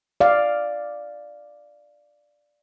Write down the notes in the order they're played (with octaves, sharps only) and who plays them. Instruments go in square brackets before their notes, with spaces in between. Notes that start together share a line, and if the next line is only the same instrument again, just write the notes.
[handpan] D5 F5